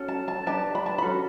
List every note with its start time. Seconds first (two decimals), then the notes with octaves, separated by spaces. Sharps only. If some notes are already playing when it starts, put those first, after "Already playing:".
Already playing: C#4 F#4 A4
0.08 A5
0.28 A5
0.46 D4 G4 B4 A5
0.75 B5
0.86 A5
0.98 C#4 F#4 A4 B5